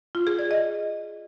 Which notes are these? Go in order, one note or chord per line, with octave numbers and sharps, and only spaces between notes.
F4
G#4
D5
D#5